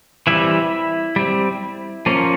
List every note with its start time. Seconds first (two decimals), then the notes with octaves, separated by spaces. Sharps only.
0.27 E3 G3 C4 E4 E5
1.16 G3 C4
2.06 F3 A#3 C#4